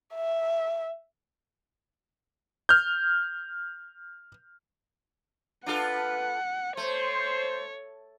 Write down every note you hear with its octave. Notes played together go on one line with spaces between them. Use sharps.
E5
F6 G6
D4 F4 A4 B4 F#5
A3 C5 C#5